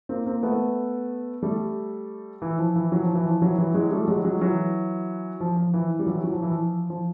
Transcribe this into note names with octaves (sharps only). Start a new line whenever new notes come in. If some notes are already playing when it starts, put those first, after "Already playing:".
A#3 C4
A#3 C4
A3 B3
G3 A3
E3
F3
E3
F#3
F3
E3
F3
E3 F#3
E3 F#3
F#3 G#3
G3 A3
F#3 G#3
F#3 G#3
E3 F#3
F3
F3
E3
G3
E3 F#3
F#3
F3
E3
F3
F3